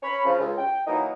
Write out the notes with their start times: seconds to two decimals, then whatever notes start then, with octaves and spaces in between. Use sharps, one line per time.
0.03 C#4 C#5 B5
0.25 C#3 F3
0.40 C#2
0.58 G5
0.86 E3 F#3 A#3 D#4